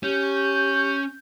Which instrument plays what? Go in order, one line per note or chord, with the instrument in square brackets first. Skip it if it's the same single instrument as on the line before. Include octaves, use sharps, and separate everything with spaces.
[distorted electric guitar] C#4 [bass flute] G4 [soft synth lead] G6